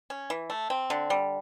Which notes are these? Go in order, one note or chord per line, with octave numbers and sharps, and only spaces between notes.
C#4
E3
A3
C4
D3
G3